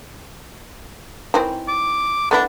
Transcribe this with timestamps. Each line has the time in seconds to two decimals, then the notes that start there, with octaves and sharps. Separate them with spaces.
1.34 D#3 E3 C4
1.68 D6
2.31 A3 B3 D4 E4